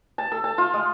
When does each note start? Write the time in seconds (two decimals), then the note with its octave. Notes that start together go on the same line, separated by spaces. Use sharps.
0.18 A5
0.32 A4
0.44 A5
0.58 F4
0.74 G#3